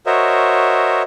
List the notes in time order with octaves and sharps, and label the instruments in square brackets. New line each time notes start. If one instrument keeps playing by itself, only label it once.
[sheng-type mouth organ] F#4 A#4 C5 C#5 D#5 E5